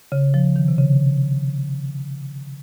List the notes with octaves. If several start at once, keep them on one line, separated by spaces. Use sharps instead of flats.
C#3
F3
D#3
C3
C#3